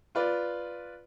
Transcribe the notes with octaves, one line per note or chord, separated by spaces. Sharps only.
F4 B4 D5